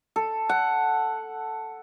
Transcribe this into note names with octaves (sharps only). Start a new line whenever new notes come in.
A4
F#5